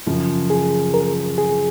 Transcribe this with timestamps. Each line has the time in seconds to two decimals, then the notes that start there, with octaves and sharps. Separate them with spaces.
0.07 F#2 C#3 F3
0.50 G#4
0.94 A#4
1.38 G#4